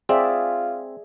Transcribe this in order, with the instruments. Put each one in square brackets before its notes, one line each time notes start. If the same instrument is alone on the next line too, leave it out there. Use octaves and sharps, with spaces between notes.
[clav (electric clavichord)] C4 [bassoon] F4 [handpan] G#4 D5 E5